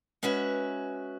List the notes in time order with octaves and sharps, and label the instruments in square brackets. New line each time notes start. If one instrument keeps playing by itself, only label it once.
[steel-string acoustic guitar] G#3 C#4 F#4 B4 E5